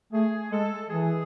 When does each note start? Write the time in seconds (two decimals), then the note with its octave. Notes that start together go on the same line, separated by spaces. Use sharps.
0.13 A3 G#4
0.51 G#3 A4
0.89 E3 G#4